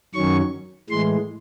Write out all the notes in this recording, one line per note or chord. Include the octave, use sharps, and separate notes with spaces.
F#2 D#3 F#3 C#4 C#6
A2 E3 G#3 C6